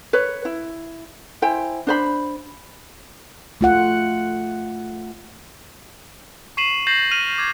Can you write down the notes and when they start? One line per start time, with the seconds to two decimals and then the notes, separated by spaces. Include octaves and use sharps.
0.13 B4 C#5
0.45 E4
1.42 E4 C5 G5 G#5
1.87 D4 C5 B5
3.61 A3 F4 F#5
6.57 C#6 B6 C7 D#7 E7 F#7
6.87 G6 A6 A#6 C7 E7 F#7
7.11 F6 D#7 F7
7.38 D6 G#6